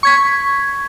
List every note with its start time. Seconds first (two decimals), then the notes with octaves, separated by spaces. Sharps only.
0.03 C#6 G#6 B6